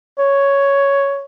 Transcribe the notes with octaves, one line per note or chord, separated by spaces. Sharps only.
C#5